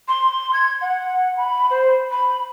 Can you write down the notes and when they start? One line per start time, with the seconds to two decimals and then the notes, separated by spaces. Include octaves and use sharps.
0.08 C6
0.53 G#6
0.81 F#5
1.37 B5
1.70 C5
2.11 B5